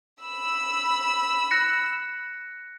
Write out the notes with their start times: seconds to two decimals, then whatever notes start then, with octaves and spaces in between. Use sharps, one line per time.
0.21 B5 E6
1.51 F#6 A#6 C#7